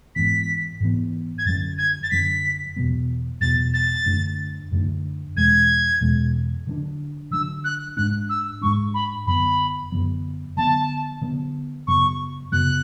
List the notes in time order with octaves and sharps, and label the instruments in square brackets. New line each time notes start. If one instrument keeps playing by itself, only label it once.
[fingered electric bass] G#2 E3 B3 [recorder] B6
[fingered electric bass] G#2 E3 B3
[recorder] G#6
[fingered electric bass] F#2 D3 F#3 C#4 [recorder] A6
[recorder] G#6
A6
[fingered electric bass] F#2 D3 F#3 C#4 [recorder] B6
[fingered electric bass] E2 B2 F#3 B3
[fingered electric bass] E2 B2 F#3 B3 [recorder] A6
[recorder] A6
[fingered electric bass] F#2 D3 A3 D4
F#2 D3 A3 D4
[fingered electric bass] E2 B2 G#3 [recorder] G#6
[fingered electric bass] E2 B2 G#3
D3 F#3 B3 D4
[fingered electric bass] D3 F#3 B3 D4 [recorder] E6
[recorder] F#6
[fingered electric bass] G#2 G#3 D4 [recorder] F#6
[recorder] E6
[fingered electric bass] G#2 G#3 D4 [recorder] C#6
[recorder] B5
[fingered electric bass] F#2 D3 F#3 B3 [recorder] B5
[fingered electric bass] F#2 D3 F#3 B3
[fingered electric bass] D3 F#3 B3 [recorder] A5
[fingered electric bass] D3 F#3 B3
[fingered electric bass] F#2 C#3 F#3 B3 [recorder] C#6
[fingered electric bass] F#2 C#3 F#3 B3 [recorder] F#6